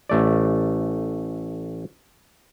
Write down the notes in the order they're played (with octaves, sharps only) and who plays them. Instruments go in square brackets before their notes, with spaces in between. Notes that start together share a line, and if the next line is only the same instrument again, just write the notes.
[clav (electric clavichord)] A1 A3 D5